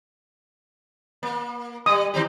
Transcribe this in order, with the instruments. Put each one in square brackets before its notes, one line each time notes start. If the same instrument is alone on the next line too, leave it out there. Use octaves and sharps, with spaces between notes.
[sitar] A#3
[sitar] G3 [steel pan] D#6
[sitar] D#3 C4 G4